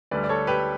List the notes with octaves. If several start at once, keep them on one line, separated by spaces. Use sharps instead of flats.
D2 D3 G3 B4 D5
D5
A4 C#5
G4 B4